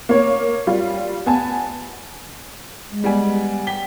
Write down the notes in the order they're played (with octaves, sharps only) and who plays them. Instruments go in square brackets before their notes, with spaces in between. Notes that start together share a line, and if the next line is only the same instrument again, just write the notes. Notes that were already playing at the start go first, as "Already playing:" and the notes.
[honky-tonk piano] A#3 C#5
G3 F4
B3 G#5 A5
[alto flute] G#3
[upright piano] G3 B3 G#5
[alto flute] G5 [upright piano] B6 G7